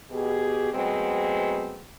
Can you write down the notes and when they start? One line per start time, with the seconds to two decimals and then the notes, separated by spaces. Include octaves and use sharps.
0.11 B2 G4 G#4
0.73 F#3 G#3 A3 B3 C4